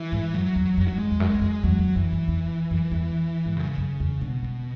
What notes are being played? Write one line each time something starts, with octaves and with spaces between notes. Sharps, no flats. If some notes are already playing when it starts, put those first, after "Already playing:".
Already playing: E3
G#2
F#2 F#3
E2
F#2
F#3
G#3
E2
F#2
E2
F#2
E2 F#3
E2
F#2 E3
F#2
E2
F#2
E2
G#2
F#2 C#3
F#2
E2
B2 D3
C#3